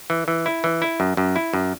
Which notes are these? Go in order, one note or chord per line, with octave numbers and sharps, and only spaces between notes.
E3
E3
E4
E3
E4
F#2
F#2
E4
F#2